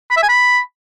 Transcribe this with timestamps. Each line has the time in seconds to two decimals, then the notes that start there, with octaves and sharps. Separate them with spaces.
0.11 B5
0.17 E5
0.23 G#5
0.29 B5